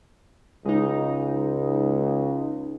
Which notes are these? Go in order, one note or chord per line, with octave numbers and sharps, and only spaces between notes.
C#2 G#3 D#4